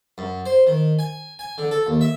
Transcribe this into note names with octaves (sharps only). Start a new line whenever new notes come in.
F#2
C5
D#3
G#5
G#5
D3
A4
D#2
E5